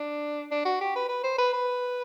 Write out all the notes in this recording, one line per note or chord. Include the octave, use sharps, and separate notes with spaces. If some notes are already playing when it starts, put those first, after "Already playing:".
Already playing: D4
D4
F#4
G4
B4
B4
C5
B4
B4